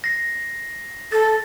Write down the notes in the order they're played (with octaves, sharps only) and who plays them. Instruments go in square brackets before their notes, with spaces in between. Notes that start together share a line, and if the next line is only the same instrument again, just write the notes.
[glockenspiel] A#6 C7
[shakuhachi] A4 [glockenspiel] A6